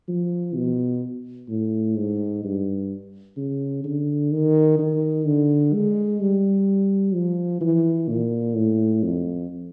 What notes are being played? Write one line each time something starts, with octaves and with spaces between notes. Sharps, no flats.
F3
B2
A2
G#2
G2
C#3
D3
D#3
D#3
D3
G#3
G3
F3
E3
A#2
A2
F2